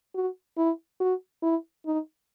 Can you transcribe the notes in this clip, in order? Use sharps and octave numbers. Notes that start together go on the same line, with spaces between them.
F#4
E4
F#4
E4
D#4